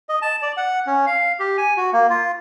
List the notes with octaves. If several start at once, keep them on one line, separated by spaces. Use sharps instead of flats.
D#5
A5
D5
F#5
C#4
F5
G4
G#5
F#4
A#3
F4